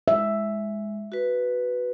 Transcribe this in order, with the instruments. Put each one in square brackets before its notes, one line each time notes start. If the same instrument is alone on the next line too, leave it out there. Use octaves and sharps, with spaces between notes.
[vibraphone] G#3 [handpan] E5
[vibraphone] F#4 B4